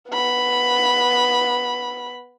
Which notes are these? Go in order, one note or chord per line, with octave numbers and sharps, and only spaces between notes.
B3 B5